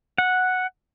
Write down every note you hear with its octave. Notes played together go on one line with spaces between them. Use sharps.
F#5